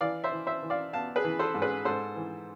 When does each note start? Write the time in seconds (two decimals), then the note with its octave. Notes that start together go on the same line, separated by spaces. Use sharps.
0.01 E3 D5 F5
0.24 C5 E5
0.32 E3
0.47 C5 E5
0.63 E3
0.70 D5 F5
0.93 B3 F5 A5
1.16 G#4 B4
1.24 E3
1.39 A4 C5
1.55 G#2
1.62 G#4 B4
1.85 G#2 A4 C5
2.16 E3